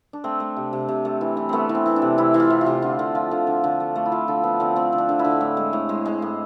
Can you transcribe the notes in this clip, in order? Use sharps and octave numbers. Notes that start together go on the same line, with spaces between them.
D4
A3 C4
A3
C3
C3
C3
A3
E3
E3
A3 B3 C4
E3
C4
E3
D4
C3
C3 E4
E3
F4
C3
F4
C3
D3 F4
D3
F3
D3
D3
D3
A3
A3
E4
F3 F4
D3 A4
F3 B3
D3 C4
A3 C4
D3
D4
D3
E4
D3
A2
G#3
A2
G#3
G#3
A2